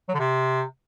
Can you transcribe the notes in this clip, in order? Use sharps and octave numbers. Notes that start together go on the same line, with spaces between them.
F#3
D3
C3